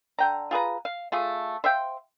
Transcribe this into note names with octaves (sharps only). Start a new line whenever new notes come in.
D3 G5 A#5
F4 G#4 B4 A#5
F5
A3 F4 G#4
C5 E5 F5 G5